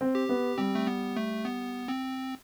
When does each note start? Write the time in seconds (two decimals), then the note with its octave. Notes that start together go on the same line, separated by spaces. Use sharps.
0.01 C4
0.15 G4
0.29 B3
0.58 G3 C4
0.75 A3
0.87 B3
1.17 A3
1.45 B3
1.88 C4